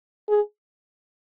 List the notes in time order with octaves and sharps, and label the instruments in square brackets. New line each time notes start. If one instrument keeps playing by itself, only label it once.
[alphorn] G#4